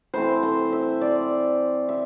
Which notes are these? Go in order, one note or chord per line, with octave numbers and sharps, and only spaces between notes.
E3 A3 C4 C5
C5
E5
D5
E5